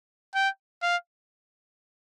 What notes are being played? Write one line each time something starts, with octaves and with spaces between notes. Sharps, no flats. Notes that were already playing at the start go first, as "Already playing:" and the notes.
G5
F5